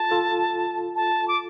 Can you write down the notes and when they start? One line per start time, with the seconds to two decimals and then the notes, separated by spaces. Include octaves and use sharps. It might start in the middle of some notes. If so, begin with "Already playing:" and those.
Already playing: F4 A4 A5
0.11 F4 A4
0.96 A5
1.28 D6